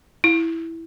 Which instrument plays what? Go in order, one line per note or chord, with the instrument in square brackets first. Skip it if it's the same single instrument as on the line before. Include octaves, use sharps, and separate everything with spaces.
[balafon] E4